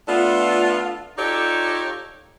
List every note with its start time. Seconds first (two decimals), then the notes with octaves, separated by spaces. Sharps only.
0.08 A3 B3 D4 F4
1.18 D#4 F4 G4 A4 C#5 D5